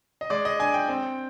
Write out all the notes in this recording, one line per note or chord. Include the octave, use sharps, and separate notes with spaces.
D#5
G#3 D5
D#5
D4 G#5
G5
C4